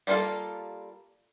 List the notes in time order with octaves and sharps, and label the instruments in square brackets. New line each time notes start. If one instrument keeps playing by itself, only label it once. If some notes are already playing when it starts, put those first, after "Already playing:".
[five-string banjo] G3 A#3 C#4 F4 A4